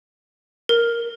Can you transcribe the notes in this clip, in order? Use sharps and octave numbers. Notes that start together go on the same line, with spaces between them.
A#4